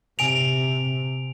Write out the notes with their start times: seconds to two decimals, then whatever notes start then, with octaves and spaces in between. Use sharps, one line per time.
0.19 C3 G#5 D7 F7